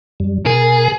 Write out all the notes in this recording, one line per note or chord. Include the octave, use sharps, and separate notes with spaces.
F#2 G3
B2 G#4 A#4 A6